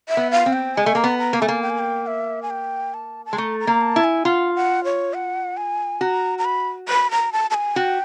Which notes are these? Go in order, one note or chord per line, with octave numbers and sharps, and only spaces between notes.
E5
B3
F5
C4
G5
G#3 G#5
A3
A#3 A#5
B3
A#5
A#3
A3 G#5
A#3
G5
G#5
G5
E5
G#5
G5
A5
A5
G#3
A3 A#5
A#5
A#3
A5
E4
G#5
F4 F#5
F#5
C#5
F#5
G#5
F#4 A#5
A#5
B5
B5
A#5
A5
A5
G#5
F#4 G5